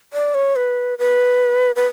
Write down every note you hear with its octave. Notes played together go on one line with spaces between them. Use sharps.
D5
C#5
B4
B4
B4